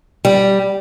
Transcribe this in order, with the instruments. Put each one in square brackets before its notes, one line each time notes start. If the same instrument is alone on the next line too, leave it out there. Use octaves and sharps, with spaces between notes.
[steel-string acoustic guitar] G3